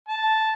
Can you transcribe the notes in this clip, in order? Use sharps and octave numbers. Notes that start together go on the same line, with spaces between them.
A5